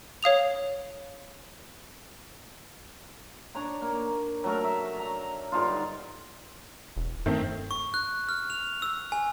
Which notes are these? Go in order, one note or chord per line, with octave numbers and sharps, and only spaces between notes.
C#5 F5 D#6 F7
D4 C#5 A#5
A#3
F#3 A3 A#4
E5
A#5
G2 D3 D#4 F4
E1
G2 D#3 A3 C4
C#6
F#6
F6
F7
E6
G#5